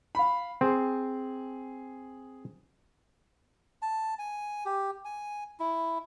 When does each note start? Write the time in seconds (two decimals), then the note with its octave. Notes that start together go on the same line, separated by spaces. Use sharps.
0.15 F5 B5
0.61 C4 G#4
3.82 A5
4.19 G#5
4.65 G4
5.05 G#5
5.59 E4